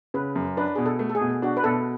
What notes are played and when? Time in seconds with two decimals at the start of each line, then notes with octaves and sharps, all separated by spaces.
0.14 C#3 B4
0.36 F#2
0.57 D4 B4
0.76 B2 G#4
0.86 A4
0.99 A3
1.09 A4
1.15 G#4
1.21 B2
1.42 D4 F#4
1.57 B4
1.64 B2 A4